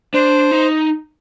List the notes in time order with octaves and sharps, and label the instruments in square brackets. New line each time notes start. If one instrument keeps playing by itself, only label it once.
[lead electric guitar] D4 [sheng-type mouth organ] C5
[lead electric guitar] D#4